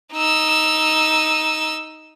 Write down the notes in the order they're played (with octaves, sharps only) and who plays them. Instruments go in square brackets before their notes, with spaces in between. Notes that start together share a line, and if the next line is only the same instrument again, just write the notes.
[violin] D#4 E6